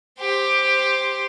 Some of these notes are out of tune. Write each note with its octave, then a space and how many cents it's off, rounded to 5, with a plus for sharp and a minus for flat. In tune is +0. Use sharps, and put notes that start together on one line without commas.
G4 +10 C5 +0